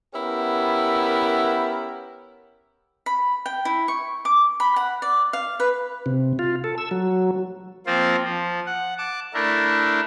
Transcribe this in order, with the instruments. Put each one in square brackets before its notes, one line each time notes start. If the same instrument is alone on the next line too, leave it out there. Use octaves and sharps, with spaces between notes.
[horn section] B3 C#4 E4 G4 A#4
[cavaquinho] B5
G5
E4
C#6
D6
B5
F#5
D5
F5
B4
[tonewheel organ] C3
F4
A4
E6
F#3
[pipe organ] F3 A#3 C4 F4 C5
F3
F#5
A5 D6
A3 D4 E4 A#4